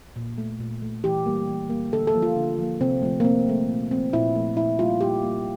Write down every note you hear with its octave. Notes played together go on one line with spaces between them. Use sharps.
A#2
A3
A#2
A3
E3 G4
G3 A#3
E3
G3 A#3
D3 A4
A4
F3 A#3
F4
D3
F3 A#3
C3 C4
F3 A3
A#3
C3 C4
F3 A3
A#2
F3 A3 C4
A#2 E4
F3 A3
A#2 E4
G3 A#3 F4
A#2 G4
G3 A#3